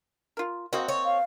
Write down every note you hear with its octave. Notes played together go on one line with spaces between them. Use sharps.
F4 A#4
A#3 C4 F#4 D#5
C#5
F5